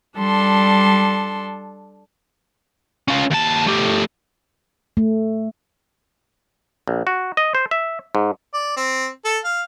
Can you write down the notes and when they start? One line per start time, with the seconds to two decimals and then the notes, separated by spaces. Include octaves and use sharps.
0.17 G3 D4 A4 C6
3.08 C#4 F4
3.31 D#2 A5
3.67 A3 G4
4.97 A3
6.88 A#1
7.07 F#4
7.37 D#5
7.55 C5
7.71 E5
8.15 G#2
8.54 D5
8.77 C4
9.25 A4
9.45 F5